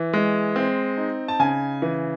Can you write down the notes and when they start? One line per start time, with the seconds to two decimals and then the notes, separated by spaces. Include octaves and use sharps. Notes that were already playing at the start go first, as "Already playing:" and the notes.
Already playing: E3
0.13 G#3
0.56 C4
0.98 D#4
1.28 A5
1.40 C#3 G#5
1.82 E3